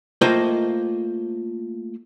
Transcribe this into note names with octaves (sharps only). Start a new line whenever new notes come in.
A3 A#3 F4 C5 D#5 G5